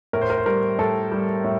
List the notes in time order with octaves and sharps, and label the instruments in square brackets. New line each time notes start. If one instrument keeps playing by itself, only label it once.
[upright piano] A2 A#4
C5
A#4
C5
G3 A#4
A2 A4
G3
A2